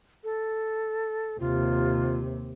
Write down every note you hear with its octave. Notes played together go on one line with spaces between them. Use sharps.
A4
D#2 C3 F4